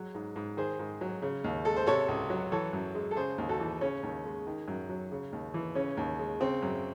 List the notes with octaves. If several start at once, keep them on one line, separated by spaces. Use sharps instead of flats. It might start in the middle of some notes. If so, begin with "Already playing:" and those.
Already playing: F#3 G#3
G#2
G#2
D#3 G#4 C5
G#2
F#3
C#3
D#2
G#3 A4
C5
C3 A4 C#5
C#2
F#3
E3 A4 C#5
F#2
G#3
A4
C#3 G#4 C5
D#2
F#4 A4
E3
C#3 C#4
D#2
G#3
D#3
F#2
F#3
C#3
D#2
E3
C#3 C#4
D#2
G#3
C#3 C4
F#2